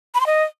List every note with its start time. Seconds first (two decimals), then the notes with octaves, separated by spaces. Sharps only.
0.15 B5
0.20 C6
0.26 D#5